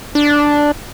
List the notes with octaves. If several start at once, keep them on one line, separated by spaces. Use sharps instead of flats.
D4